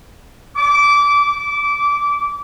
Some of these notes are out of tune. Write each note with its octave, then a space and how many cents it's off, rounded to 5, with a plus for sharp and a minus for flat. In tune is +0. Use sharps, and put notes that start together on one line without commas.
D6 -20
D6 -20